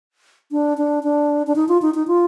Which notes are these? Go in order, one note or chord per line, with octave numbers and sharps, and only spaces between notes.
D4
D4
D4
D4
D#4
F4
D#4
D#4
F4